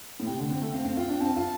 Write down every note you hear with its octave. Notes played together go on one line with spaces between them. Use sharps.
A2
C3 G5
D3
C4
A3
C4 F5
C4
F4 G5
D4
C4 A5
F4